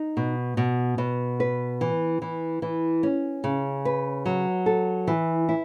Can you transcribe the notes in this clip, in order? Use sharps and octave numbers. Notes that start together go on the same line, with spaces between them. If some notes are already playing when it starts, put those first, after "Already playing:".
Already playing: D#4
B2
B2
B2
B4
E3
E3
E3
C#4
C#3
B4
F#3
A4
E3
E4